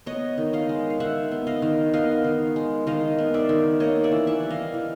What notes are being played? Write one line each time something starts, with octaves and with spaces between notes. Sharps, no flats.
B3 C#5 D#5
D#3
D#5 F5
G#3
F5
D#3 E5 F#5
B3
D#5 F5
D#3
B3 D#5 F5
D#3
G#3
D#3 D#5 F5
B3
D5 E5
D#3
A#3 C#5 D#5
D5 E5
E3
E5 F#5
G3
D#5 F5
E3